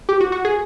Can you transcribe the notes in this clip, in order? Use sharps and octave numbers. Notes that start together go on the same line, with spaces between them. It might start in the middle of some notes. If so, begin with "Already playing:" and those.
G4
F#4
F#4
G#4